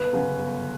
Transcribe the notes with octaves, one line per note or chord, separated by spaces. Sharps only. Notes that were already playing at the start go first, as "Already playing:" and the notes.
Already playing: G1 B4
F#2 C#3 F#3
G1